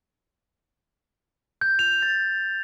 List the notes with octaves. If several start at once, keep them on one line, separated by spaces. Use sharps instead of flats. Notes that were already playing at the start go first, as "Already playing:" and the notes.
G6
F7
A6